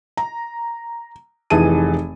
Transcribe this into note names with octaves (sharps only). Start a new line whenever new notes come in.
A#5
F1 E3 D#4 G#4 A5 D#7